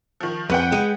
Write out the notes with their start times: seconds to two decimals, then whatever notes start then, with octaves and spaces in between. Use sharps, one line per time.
0.20 D#3 F3
0.50 F2 B4 F#5 G5
0.72 G#3